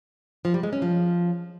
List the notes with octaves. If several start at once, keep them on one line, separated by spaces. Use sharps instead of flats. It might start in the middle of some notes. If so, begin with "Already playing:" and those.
F3
G3
G#3
C#4
F3